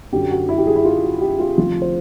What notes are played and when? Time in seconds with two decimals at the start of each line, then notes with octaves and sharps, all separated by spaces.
0.12 F#2 D3 F#3 G4
0.31 F#4
0.49 E4
0.58 G4
0.67 G#4
0.76 E4
0.85 F4
1.03 F#4
1.21 G4
1.40 F4
1.58 D2 C3 F3 F4
1.82 C5